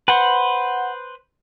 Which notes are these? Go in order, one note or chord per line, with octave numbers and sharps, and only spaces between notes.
B4 C5 F#5